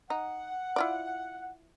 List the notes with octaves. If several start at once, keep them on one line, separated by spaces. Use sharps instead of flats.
D#4 F#5
E4 F4 D5